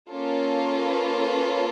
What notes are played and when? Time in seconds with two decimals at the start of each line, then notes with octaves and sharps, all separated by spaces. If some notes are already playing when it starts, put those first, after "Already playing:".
0.11 A#3 C#4 F4 A4
0.84 B4
1.20 B4